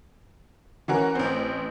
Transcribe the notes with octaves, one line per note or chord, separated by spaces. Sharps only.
E3 C#4 F#4 A#4
A1 C4